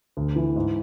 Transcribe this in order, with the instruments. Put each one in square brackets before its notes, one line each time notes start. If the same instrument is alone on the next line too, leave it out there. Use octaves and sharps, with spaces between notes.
[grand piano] D2
E3
G#2